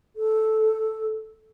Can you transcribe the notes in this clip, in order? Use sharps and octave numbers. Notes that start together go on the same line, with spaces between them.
A4